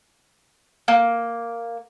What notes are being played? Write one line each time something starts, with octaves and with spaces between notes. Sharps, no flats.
A#3